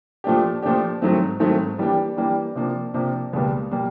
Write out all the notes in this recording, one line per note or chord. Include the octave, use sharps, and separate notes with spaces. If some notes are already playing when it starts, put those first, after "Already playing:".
A#2 F3 A3 D4 G4
A#2 F3 A3 D4 G4
G#2 D#3 F#3 A3 C4
G#2 D#3 F#3 A3 C4
E3 G3 A#3 D4 G4
E3 G3 A#3 D4 G4
C3 F3 A#3 D4
C3 F3 A#3 D4
C#2 B2 G3 A#3
B2 G3 A#3